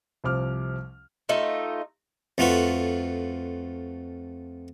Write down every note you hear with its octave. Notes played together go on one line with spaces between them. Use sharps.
C2 C3 F3 D6 F6
A3 D#4 F4
F2 A3 F4 F#4 B4